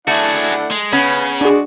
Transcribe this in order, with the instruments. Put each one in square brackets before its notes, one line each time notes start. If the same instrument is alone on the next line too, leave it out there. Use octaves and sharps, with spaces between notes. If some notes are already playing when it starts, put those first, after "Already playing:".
[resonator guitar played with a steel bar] A3 [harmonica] D4 E4 F#5 [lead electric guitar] F#4 G#4
[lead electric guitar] G#3
[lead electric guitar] C#3 [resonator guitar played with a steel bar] B3 C#4 [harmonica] B4
[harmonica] G#3 F#4 D5 [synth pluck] D4 G#4